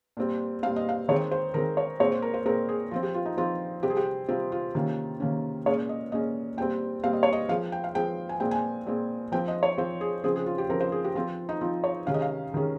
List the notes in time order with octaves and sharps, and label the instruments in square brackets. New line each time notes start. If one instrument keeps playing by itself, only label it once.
[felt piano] A#2 G3 C4
A#2 G3 C4 F5
D#5
F5
D#3 G#3 C4 C#5
C5
D#3 G#3 C4 A#4
C#5
A#2 G#3 C4 C#5
C5
A#4
C5
A#2 G#3 C4 A#4
G#4
F3 C4 F4
G4
F4
D#4
F3 C4 F4
C3 G3 C4 G4
G#4
G4
C3 G3 C4 F4
F4
C3 D#3 A#3 C#4
C3 D#3 A#3 C#4
A#2 G#3 C#4 C#5
D#5
A#2 G#3 C#4 D#5
A#2 G3 C4 G5
A#2 G3 C4 F5
D#5
C#5
D#5
F3 G#3 C4 F5
G5
F5
F3 G#3 C4 G5
G#5
A#2 G#3 C4 G5
G#5
A#2 G#3 C4
F3 C4 G5
D#5
C#5
F3 C4 C5
G#4
C#3 F3 C4 G#4
G#4
F4
G4
C#3 F3 C4 A#4
C5
G#4
G4
F3 C4 F4
D#4
F3 C4 F4
C#5
C3 D#3 G#3 C#4 F5
D#5
F5
C3 D#3 G#3 C#4